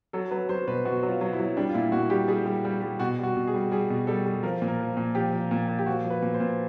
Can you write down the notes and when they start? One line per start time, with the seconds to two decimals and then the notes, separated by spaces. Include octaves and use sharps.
0.13 F#3 A4
0.31 F#3 B4
0.49 F#3 C5
0.67 B2 B4
0.85 B2 F#4
1.03 F#3
1.09 F4
1.21 F#3
1.33 E4
1.39 F#3
1.57 G3 D4
1.69 F4
1.74 A#2 E4
1.92 A#2 F#4
2.10 G3 G4
2.28 G3 G#4
2.46 G3
2.65 G3
2.82 G3
3.00 B2 F#4
3.19 G3 F#4
3.37 B2
3.47 G#4
3.54 G3
3.71 G3 G#4
3.90 B2
4.07 G3 A4
4.26 G3
4.43 F3 A#4
4.62 A#2
4.68 A#4
4.80 F3
4.97 A#2
5.15 F3 G4
5.33 F3
5.51 A#2
5.68 A#2
5.79 G4
5.86 F3 F#4
6.04 F3
6.10 B4
6.22 A#2
6.34 C5
6.40 A#2